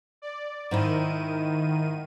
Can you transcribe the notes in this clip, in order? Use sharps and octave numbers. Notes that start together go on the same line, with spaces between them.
D5
G#2 D#3 D#4 E4 D#7